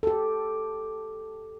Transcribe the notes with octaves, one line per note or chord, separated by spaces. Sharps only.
G4 A4